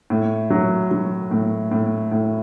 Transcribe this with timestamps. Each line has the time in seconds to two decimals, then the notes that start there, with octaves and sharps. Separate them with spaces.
0.10 A2
0.50 F#3
0.91 F#3
1.31 A2
1.72 A2
2.12 A2